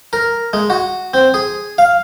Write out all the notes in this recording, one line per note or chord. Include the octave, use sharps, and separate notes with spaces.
A#4
G#3
F#4
C4
G#4
F5